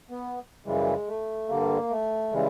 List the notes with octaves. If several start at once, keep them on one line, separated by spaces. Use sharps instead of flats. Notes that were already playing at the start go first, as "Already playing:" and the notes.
B3
F#2 C#3 E3 G3 G#3
A3
G2 D3 G3 A#3
A3
C#3 E3 G3 G#3